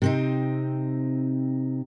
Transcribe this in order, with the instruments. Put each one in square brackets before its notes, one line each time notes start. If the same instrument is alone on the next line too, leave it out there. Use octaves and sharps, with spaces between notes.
[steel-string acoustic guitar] C3 C4 D#4